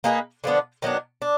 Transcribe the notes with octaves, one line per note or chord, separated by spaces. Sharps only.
A#3 D#4 G#4 B4
D3 F3 B3 D4
D#3 F#3 B3 D4
D4